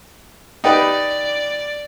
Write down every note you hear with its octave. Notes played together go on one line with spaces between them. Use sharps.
D#4 G4 B4 D5